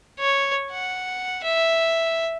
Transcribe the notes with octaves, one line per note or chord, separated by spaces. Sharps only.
C#5
F#5
E5